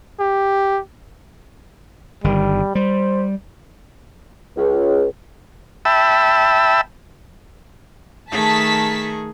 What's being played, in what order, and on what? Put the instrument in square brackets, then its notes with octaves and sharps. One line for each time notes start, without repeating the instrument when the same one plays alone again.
[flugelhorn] G4
[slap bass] G1 D#3 [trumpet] G3
[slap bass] G3 [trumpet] C5
[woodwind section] C#2
[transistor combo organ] E5 G5 A5 B5 E6
[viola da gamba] D#3 A3 G#4 [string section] A5 B6